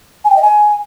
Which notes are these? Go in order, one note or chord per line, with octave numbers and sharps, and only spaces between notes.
G#5
G5
D#5
G#5